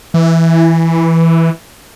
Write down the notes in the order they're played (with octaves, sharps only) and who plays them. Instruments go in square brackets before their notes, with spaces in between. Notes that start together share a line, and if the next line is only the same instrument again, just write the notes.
[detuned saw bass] E3